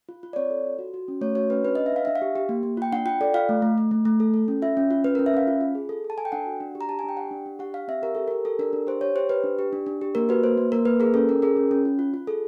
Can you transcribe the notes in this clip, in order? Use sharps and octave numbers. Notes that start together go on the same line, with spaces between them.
F4
F4
D5
C4 C#5
A4
F4
F#4
F#4
C#4
A3 C#5
F#4 C#5
C#4 B4
D4 B4
D#5
D4
E5
D4 F5
D4 E5
F5
G4
G4
A#3
A#3
F4 G5
D4 F#5
F4 G5
A4 D5
F4 F5
A3
A3
A3
A3
A3
A4
A4
C#4
F4 E5
C#4
F4
C#4 B4
A#4
C#4
E5
C#4 F5
F4
F4
G#4
A4
A4
A5
A4 G#5
G5
D4 F#5
F#4
D4
G4
A#5
G4 A5
G#5
D4
G5
G4 F#5
D4
D4
G4 F#5
G4 F5
C4 E5
G4 A#4
G4 A4
A#4
G4
G4 A4
D4 A#4
D4
G4 C5
G4 C#5
G4 C5
G4 B4
D4
G4
D4
D4
G4
A#3 A#4
F#4 B4
A#3 C5
A#3
A#3 A#4
A#3 B4
G#4 A#4
C#4 A4
C#4 A#4
G#4 A#4
C#4
C#4
F4
F4
F4
G#4 A4